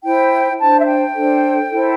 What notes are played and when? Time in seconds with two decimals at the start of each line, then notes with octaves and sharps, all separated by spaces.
0.03 E4 C5 G5
0.60 D4 C5 A5
0.80 E5
0.87 G5
1.15 D4 A4 C5
1.71 E4 A4 C5